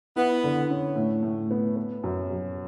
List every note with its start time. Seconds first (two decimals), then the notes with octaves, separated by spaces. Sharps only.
0.16 B3 E4
0.44 D3
0.70 C#4
0.96 A2
1.23 A2
1.51 B3
1.76 B3
2.04 F#2
2.30 F#3